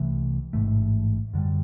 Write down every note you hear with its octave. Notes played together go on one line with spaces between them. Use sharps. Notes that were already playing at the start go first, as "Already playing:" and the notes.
Already playing: C2 C3 E3 A3
A1 G#2 E3 A3
F#2 D3 G3